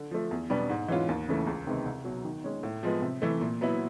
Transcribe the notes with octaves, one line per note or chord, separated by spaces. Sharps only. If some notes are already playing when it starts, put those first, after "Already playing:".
Already playing: D3
F3 A3
E2
B2 G3 B3 D4
G#2
E3 G#3 C#4 F4
D#2
C#3 E3 A3
C#2
C3 D#3 G#3 B3
C2
B2 F#3
D#3
G#3 C#4
A2
F3 G#3 B3
C3
E3 A3
A#2
F#3 B3 E4